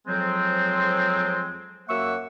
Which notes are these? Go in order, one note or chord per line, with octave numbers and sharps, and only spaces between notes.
F2 F3 F#3 G#3 C4
F#2 A#3 E5 F#5 C#6 E6